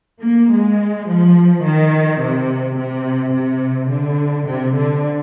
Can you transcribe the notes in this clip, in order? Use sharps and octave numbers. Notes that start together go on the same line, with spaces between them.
A#3
G#3
F3
D#3
C3
C3
C3
D3
C3
D3